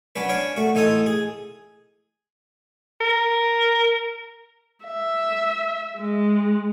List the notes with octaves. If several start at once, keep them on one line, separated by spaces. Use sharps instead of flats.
F#3 C#4 D4 B4
C#4 D4 C#5 F5
A3 F#4
A1 D#4 F4 A4 G#5 D#6
G#4
A#4
E5
G#3